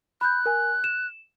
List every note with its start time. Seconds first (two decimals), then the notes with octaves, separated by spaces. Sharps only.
0.21 B5 F#6 G6
0.46 A#4 G#5
0.84 E7